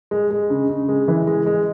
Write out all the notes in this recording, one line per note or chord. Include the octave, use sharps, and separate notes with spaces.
G#3
G#3
C#3
C#3
G#3
E3
G#3
G#3